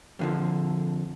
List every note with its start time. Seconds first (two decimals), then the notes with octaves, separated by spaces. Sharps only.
0.19 F2 D3 F3